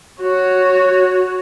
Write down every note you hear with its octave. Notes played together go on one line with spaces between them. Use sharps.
F#4 C#5